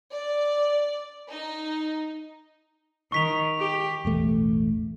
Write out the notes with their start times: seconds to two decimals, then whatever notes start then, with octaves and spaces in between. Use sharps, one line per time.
0.13 D5
1.30 D#4
3.12 D#3 C#6 B6 F7
3.59 G4
4.05 E1 A1 A3